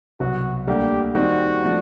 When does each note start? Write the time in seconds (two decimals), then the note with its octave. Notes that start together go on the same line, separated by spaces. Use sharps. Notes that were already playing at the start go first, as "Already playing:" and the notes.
0.20 C2 B2 F#3 B3 F#4
0.67 D2 D3 G3 A#3 G4
1.15 D#3 G3 C4 D#4 F#4
1.63 F3 A3 D4